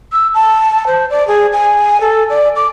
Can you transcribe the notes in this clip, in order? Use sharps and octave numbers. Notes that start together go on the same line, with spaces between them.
E6
A5
C5
D5
G#4
G#5
A4
D5
D6